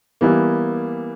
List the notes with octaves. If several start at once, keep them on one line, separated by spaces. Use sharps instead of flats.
E3 G3 A#3 B3 E4